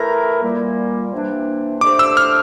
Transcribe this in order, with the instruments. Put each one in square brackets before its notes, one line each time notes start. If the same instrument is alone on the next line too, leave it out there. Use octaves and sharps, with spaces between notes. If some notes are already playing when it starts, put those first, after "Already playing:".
Already playing: [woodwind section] E3 A3 E4 A#4 [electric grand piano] A#5
[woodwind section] A#2 G3 A#3
C3 E3 A#3 D4
[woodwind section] D3 A3 D4 G4 C5 [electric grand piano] D6
[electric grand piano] E6
F6